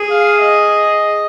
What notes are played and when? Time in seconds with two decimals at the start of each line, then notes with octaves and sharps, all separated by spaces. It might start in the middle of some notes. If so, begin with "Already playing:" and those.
Already playing: G#4
0.10 F5
0.39 D#5